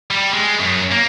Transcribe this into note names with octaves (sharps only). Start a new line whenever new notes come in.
G3
G#3
F#2
A#3